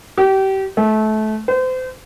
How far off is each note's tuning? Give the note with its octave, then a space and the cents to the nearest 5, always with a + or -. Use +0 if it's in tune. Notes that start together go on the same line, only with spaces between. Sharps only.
G4 -30
A3 -25
C5 -35